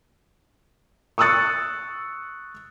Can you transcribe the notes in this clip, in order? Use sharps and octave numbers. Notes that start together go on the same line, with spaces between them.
C#6 D#6 E6 F#6 A6 C#7